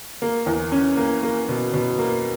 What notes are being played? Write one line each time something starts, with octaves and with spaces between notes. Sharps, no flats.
A#3
E2
C#4
A#3
A#3
B2
B2
A#3